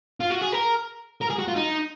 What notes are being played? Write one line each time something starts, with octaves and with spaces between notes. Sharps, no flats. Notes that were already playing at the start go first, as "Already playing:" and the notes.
F4
F#4
G#4
A#4
A#4
G#4
F#4
F4
D#4